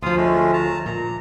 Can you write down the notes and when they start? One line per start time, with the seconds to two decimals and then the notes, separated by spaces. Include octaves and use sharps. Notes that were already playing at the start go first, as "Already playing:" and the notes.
0.03 D2 F3 F4 F5 D#6
0.17 G#3 A3 C#4
0.53 A5 A#5
0.86 A#2 A#5